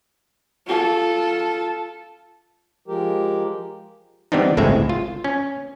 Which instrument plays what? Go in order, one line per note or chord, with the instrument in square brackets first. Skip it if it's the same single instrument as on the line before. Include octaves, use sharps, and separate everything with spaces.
[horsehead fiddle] F4 A4
[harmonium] F3 G#3 G4 A#4
[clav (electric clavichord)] E3 G3 B3 C4 D4 D#4
G1 C#2 A2 G#3 C4 E5
F4
C#4